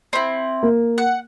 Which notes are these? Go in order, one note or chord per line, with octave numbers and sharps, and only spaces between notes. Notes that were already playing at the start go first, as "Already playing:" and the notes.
C4 E4
A#3
F#5